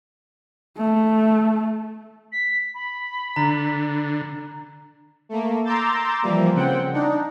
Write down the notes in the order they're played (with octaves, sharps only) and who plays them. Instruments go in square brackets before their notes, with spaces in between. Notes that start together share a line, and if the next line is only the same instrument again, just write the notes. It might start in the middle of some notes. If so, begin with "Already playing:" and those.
[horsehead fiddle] A3
[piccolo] B6
B5
[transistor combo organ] D3 [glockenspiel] A#5
[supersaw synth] A3 A#3
A#5 C6 D6 E6 G6 A6
E3 F3 G3 A#3
C#3 C4 F#5 G5
D4 D#4